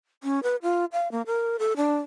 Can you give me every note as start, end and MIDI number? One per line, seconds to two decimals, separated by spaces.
0.24 0.40 61
0.43 0.56 71
0.63 0.85 65
0.93 1.11 77
1.12 1.22 58
1.27 1.57 70
1.59 1.73 69
1.77 1.97 62